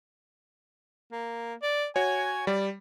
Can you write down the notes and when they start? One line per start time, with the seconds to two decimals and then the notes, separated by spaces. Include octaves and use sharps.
1.12 A#3
1.62 D5
1.96 F#4 C#5 G#5
2.47 G3 D5